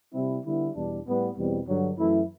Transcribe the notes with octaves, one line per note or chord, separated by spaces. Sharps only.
C3 G3 C4 E4
D3 G3 B3 E4
E2 B2 G3 D4
A2 G3 B3
E2 B2 G3 C4
G2 D3 F#3
F#2 E3 A3 E4